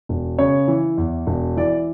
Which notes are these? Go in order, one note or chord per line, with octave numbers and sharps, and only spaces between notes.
E1
C#3 C#5
E3
E2
E1
E3 D5